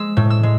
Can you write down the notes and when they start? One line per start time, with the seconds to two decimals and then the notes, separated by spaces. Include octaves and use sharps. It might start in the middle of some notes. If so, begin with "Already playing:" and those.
Already playing: G#3 E6
0.17 A2
0.30 E6
0.43 G#3